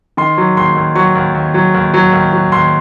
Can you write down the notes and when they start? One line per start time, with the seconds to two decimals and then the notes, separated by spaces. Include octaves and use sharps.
0.17 D#3 C6
0.38 F#3
0.57 D#2 C6
0.76 D#2
0.95 F#3 C#6
1.15 D#2
1.35 D#2
1.54 F#3
1.75 D#2
1.94 F#3
2.13 D#2
2.33 F#3
2.52 D#2 C6